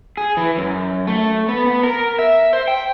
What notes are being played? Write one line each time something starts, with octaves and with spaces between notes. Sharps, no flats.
G#4
E3
F#2
A3
B3
B3
A#4
E5
C5
G5